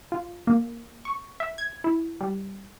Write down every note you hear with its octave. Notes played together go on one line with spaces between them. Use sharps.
F4
A#3
C#6
E5
G#6
E4
G3